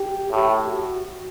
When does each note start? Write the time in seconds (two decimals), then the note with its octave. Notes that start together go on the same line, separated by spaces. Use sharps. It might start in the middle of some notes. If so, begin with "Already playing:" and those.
Already playing: G4
0.30 A2 G4
0.68 F#4